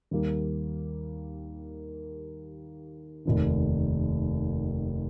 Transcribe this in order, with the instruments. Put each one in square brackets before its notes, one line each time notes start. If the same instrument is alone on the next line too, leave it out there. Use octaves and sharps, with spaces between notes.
[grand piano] D#2 D#3 G3 A#3
F1 D#2 D#3